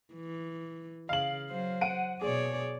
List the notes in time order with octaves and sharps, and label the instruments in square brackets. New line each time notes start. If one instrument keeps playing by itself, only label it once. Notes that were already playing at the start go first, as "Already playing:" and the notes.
[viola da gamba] E3
[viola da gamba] C#3 [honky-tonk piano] F5 F#7
[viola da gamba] F#3 C5
[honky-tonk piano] F#5 D7 D#7
[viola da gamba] B2 C#5 D5 [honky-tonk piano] G#4